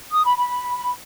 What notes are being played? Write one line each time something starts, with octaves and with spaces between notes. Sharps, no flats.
D#6
B5
B5